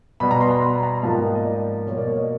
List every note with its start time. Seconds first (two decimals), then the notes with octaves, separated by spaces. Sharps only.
0.20 B2 G3 B3 B5
0.31 A#5
0.41 C6
0.51 A#5
0.62 B5
0.83 A#5
1.03 G#2 F3 A#3 A5
1.14 G5
1.24 D#5
1.35 D#5
1.45 D5
1.86 B2 G3 A#3 C#5
1.98 D5
2.07 C#5
2.18 D#5